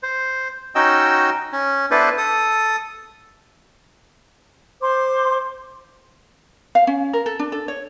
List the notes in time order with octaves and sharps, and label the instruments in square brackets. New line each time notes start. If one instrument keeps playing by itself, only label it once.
[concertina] C5
C#4 D#4 F#4 D#5 G5 E6
C#4
B3 D4 E4 A4 B4 C5
A4 D#6
[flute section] C5 C6 D6
[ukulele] F5
C#4
A#4
A4
D4
A4
C#5